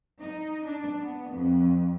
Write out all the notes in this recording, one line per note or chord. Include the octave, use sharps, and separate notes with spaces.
D#4
D4
B3
F2